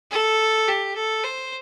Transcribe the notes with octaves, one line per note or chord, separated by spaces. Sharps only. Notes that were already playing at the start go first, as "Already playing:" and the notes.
A4
G4
A4
C5